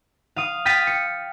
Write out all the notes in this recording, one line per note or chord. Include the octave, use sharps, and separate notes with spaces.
F5 D#6
G5 F6 A6 B6 D#7
C#7